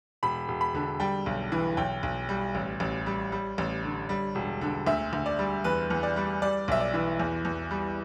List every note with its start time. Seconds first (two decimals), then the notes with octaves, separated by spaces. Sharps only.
0.23 E1 B5
0.48 E1
0.61 B5
0.74 D3
1.00 G3 G5
1.26 B1
1.52 E3
1.77 B1 G5
2.03 B1
2.29 G3
2.55 A1
2.80 A1
3.06 G3
3.32 G3
3.58 A1
3.84 D3
4.09 G3
4.35 E1
4.61 D3
4.87 D2 E5
5.13 D2
5.26 D5
5.39 G3
5.64 E2 B4
5.90 E2
6.03 D5
6.16 G3
6.42 G3 D5
6.68 B1 E5
6.80 D5
6.94 E3
7.19 E2
7.45 E2
7.71 G3